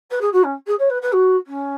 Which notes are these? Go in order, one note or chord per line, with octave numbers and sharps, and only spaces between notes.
B4
G#4
F#4
C#4
G#4
C#5
B4
B4
F#4
C#4